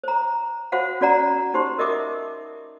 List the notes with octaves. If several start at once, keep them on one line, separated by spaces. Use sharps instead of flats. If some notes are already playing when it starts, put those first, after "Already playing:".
C5 A#5
F#4 C5 F5 F#5
C#4 F#4 D5 F#5 A#5
D#4 G4 C5 C6
A#4 D#5 E5 D6 D#6